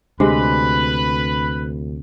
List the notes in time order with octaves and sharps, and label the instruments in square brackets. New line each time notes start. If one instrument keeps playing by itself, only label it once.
[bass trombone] D2 [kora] C3 G#3 [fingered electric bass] D4 [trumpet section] B4 B5